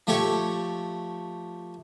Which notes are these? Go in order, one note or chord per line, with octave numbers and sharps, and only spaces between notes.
F3 A3 G4 A4 C#5 C#6